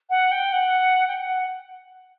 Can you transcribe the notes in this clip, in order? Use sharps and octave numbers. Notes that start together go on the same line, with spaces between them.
F#5
G5
F#5
G5
F#5